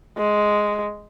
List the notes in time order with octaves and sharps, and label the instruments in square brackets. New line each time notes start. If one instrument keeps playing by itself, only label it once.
[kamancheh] G#3